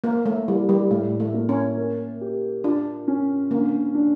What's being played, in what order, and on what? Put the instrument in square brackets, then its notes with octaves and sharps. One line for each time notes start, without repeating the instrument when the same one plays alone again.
[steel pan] A#3 [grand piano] A#4
[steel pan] A3
[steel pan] G3 [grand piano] E4
[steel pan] G3
[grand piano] A2 [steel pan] A3
[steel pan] A3
[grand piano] A#3
[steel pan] C#4
[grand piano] A#4
G4
[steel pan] D4 [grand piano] F4
[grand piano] C#4
[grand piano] D3 [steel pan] A#3
[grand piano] D4